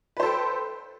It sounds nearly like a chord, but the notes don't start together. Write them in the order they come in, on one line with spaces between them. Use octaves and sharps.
B4 C5 A4 G5